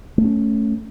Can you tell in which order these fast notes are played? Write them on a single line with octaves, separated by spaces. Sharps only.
A3 B3 C#4